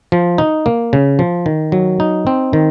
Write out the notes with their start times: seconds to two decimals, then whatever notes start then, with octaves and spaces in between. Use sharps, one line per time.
0.12 F3
0.38 D#4
0.66 A#3
0.93 C#3
1.19 F3
1.46 D#3
1.72 F#3
2.00 D#4
2.27 C4
2.53 D#3